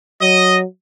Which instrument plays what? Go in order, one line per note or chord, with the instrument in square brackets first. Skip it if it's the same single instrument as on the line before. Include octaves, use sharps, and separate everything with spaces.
[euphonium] F#3 [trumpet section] D#5